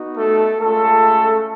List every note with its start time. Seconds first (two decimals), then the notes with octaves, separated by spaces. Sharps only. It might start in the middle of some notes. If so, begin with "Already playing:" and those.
Already playing: B3 D#4 F#4
0.18 A3 A4
0.61 G#3 A3 C#4 F4 A4